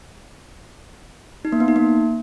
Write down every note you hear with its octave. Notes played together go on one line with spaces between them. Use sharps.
D#4
A#3
B3
D#4
A#3